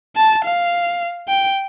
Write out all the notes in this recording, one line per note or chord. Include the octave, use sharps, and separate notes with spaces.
A5
F5
G5